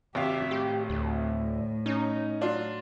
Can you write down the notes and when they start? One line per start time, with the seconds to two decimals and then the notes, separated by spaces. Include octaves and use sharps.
0.15 G#1 C3 G4 E5 F5
0.51 A2 G4
0.90 D2
1.86 C#4 D#4
2.41 F#3 D4 F4